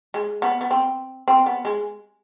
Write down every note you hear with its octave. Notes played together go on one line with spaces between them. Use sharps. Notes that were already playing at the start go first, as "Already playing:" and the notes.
G#3
B3
B3
C4
C4
B3
G#3